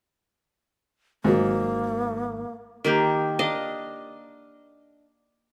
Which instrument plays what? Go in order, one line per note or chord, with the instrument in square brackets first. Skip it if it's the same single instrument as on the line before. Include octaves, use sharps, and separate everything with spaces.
[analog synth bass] G#1 [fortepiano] G#2 F#3 [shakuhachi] A#3
[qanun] D#3 A#3 G4
D4 D#5 F5